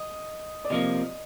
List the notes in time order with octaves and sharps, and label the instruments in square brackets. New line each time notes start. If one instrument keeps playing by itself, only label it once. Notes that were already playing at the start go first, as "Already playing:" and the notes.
Already playing: [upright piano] D#5
D5
[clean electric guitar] C3 F3 A#3 [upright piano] D#5